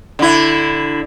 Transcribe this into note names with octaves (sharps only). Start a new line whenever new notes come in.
D3 E4